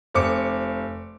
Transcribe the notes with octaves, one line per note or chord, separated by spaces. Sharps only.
F1 C4 D6 C#7